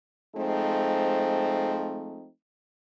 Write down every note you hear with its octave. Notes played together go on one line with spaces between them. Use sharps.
F3 G#3 A3 C4 D#4